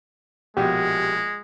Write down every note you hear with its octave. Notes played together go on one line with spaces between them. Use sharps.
A#1 B2 G#3 G4